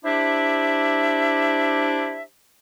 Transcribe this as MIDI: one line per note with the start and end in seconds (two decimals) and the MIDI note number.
0.04 2.22 62
0.04 2.22 64
0.04 2.22 67
0.04 2.22 72
0.04 2.22 76